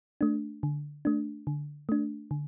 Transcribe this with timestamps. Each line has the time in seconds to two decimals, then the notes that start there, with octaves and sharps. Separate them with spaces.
0.21 A3 D4
0.63 D3
1.05 A3 D4
1.47 D3
1.89 A3 D4
2.31 D3